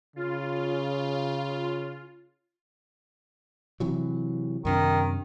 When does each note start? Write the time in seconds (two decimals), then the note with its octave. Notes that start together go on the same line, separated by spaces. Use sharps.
0.16 C#3 F4
3.80 C3 E3 F#3
4.65 F#2 C3 D#3 D4